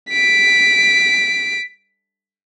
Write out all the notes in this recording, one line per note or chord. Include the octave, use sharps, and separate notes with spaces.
B6 D7